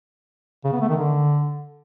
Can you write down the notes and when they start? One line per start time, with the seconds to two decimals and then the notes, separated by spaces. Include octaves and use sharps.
0.64 C#3
0.73 B3
0.81 A3
0.89 D#3
0.97 D3